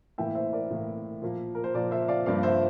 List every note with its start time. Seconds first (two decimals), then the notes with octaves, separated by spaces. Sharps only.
0.18 A2 E3 A#3 E5 G5
0.35 C5 E5
0.53 A#4 D5
0.70 A2 E3 A#3
1.22 A#2 F3 A#3
1.55 A#4
1.64 C5
1.74 A#2 F3 A#3 A#4 D5
1.91 C5 E5
2.08 D5 F5
2.26 G2 F3 A#3 D5 F5
2.43 C5 E5